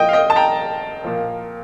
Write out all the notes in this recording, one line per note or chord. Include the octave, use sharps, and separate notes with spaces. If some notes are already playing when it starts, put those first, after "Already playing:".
Already playing: A#2 F3 D#5 G5
F5
D#5 G5
A5
G5 A#5
A#2 F3